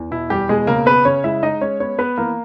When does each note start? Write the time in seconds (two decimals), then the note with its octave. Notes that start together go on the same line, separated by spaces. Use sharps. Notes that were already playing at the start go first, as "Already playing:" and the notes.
Already playing: E2
0.11 B2 E4
0.30 E2 G3 G4
0.49 B2 G#3 G#4
0.67 C#3 A#3 A#4
0.86 B3 B4
1.05 C#3 C#4 C#5
1.24 G#3 E4 E5
1.43 G#3 D#4 D#5
1.61 G#3 C#4 C#5
1.80 B3 C#4 C#5
1.99 B3 B4
2.17 E3 A#3 A#4